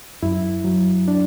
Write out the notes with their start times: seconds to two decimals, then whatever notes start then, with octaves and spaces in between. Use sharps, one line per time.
0.23 F#2 E4
0.64 F#3
1.08 D4